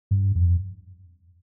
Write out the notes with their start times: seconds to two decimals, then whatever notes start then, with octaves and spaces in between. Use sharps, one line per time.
0.11 G2
0.35 F2